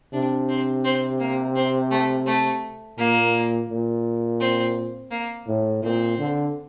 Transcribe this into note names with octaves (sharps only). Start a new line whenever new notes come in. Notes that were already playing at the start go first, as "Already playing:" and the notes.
C3 D4
C4
C4
A#3
C4
A3
A3
A#2 A#3
A#2
C4
A#3
A2
A#2 C4
D3